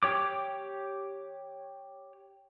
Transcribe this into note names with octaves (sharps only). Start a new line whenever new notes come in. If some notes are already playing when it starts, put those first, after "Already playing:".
G4 C#5 D6